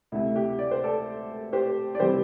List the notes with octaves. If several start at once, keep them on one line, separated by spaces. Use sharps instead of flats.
D2 C3 A3 E4
G4
D5
C5
A4 D5
G4 C5
D5
C3 E3 G3 G4 C5